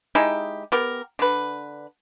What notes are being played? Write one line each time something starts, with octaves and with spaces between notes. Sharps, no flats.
G#3 D#4 E4 G4
B3 G4 A#4
D3 B4